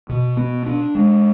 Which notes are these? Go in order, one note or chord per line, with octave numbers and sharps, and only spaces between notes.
B2
B3
D4
G#3